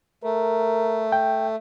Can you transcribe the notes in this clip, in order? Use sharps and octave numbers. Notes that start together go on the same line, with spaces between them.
A3 A#4
G5